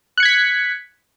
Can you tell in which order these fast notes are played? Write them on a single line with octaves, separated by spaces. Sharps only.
F#6 C#7 G#6 B6